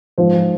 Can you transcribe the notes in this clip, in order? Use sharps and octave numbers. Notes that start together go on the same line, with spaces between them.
G#2 F3 C5